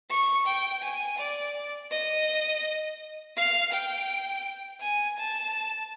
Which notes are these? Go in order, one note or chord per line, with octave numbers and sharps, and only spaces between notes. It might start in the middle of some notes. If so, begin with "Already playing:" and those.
C#6
G5
G#5
D5
D#5
F5
G5
G#5
A5